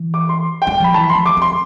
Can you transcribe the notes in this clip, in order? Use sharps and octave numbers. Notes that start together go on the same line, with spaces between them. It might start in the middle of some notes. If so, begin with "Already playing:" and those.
Already playing: E3
D6
C6
G5
G3
F3 B5
E3 A5
B5
C6
F3
D6
C4 C6